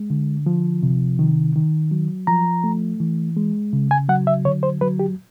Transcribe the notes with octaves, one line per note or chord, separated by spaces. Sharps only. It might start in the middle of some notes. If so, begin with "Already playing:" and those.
Already playing: G#3
D3
F3
C3
D#3
D#3
F#3
F3 A#5
A3
E3
G#3
C#3
G#5
F#3 F#5
E5
D3 C#5
C5
F#3 B4
G4